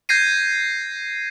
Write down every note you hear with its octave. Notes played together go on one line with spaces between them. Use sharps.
G6 G#6 A#6 C7 D#7